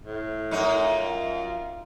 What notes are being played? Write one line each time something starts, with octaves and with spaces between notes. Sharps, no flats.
A2
F#2 D#4
F4